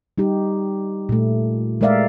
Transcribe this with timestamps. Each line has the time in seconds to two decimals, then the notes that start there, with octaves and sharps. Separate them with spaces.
0.18 G3 D#4 G4
1.09 A#2 A3
1.81 G#3 A3 A#4 D5 E5 F5